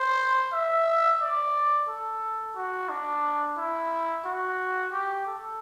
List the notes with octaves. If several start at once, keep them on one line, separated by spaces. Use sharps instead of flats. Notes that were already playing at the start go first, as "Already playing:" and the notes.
Already playing: C5
E5
D5
A4
F#4
D4
E4
F#4
G4
A4